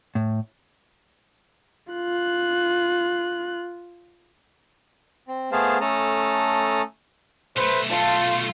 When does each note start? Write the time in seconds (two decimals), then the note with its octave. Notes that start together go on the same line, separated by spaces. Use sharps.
0.15 A2
1.92 F4 F#6
5.28 C4
5.52 A3 B3 G#4 C5 F5 A5
5.81 A3 C#4 A4 A5 A#5 D#6
7.56 B1 A3 B4 C5
7.91 F4 A5